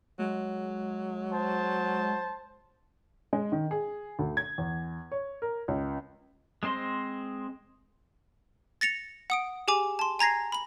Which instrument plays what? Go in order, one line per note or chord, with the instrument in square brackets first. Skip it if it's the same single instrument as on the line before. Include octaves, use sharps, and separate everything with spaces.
[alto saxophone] F#3 [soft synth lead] G#3
[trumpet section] C5 A5
[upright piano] G#3
D#3
G#4
D2
G#6
E2
C#5
A#4
C#2
[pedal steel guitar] G#3 C4 C5 D#5 C6
[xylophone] A6 A#6 C#7 F7
F#5 D#6 D7
G4 G#4 G#5 D6
A5 C6
G#5 A#5 G#6 A#6 C7
B5 F#7